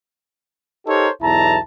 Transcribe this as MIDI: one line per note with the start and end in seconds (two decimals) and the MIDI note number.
0.87 1.08 63
0.87 1.08 67
0.87 1.08 69
0.87 1.08 70
0.87 1.08 72
0.87 1.08 73
1.22 1.58 35
1.22 1.58 40
1.22 1.58 64
1.22 1.58 81
1.22 1.58 82